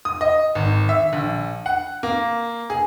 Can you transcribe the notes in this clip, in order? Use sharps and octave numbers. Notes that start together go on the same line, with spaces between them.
D#6
D#5
G#1
E5
A#1
F#5
A#3
G#4